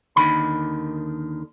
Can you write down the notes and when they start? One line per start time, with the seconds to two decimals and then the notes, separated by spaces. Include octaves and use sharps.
0.16 D#2 D3 D#3 B5